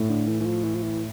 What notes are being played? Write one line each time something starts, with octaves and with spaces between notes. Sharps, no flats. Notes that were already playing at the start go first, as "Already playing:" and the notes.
Already playing: A2
D3
E3
E3
F3
E3
F3
E3